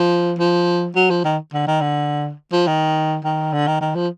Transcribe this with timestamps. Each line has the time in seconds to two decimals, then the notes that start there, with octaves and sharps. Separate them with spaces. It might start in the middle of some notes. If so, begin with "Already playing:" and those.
Already playing: F3
0.39 F3
0.96 F#3
1.10 F3
1.25 D#3
1.53 D3
1.67 D#3
1.81 D3
2.52 F3
2.67 D#3
3.24 D#3
3.53 D3
3.67 D#3
3.80 D#3
3.95 F3